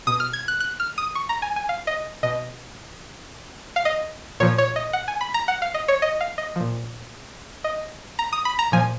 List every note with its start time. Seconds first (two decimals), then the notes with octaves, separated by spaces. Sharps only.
0.07 B2 D#6
0.20 F6
0.33 G#6
0.48 F#6
0.60 F#6
0.80 F6
0.98 D#6
1.15 C#6
1.29 A#5
1.42 G#5
1.56 G#5
1.69 F5
1.87 D#5
2.23 B2 D#5
3.76 F5
3.85 D#5
4.40 A#2 F3 C#5
4.58 C#5
4.76 D#5
4.93 F#5
5.08 G#5
5.21 B5
5.34 A#5
5.48 F#5
5.62 F5
5.74 D#5
5.88 C#5
6.02 D#5
6.21 F5
6.38 D#5
6.56 A#2 F3
7.64 D#5
8.19 A#5
8.33 D#6
8.45 B5
8.59 A#5
8.72 A#2 F3 G#5